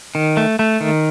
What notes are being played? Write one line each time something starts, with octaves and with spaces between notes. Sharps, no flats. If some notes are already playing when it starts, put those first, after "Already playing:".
D#3
A3
A3
D#3